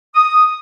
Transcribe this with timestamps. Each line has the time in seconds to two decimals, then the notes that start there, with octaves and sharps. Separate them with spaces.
0.15 D#6